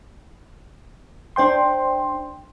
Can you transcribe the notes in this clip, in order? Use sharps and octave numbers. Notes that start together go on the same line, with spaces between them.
D4 C5 G5 C6